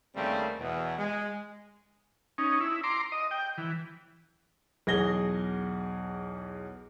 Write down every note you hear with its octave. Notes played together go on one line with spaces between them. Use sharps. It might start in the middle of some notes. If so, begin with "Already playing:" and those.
D#2 C#3 G3 A3 C4 A#4
E2 B2
G#3
C#4 D#4
E4
A#5 C6 D6
D#5
G5
E3
B1 E2 G#4 G#6 A#6 G7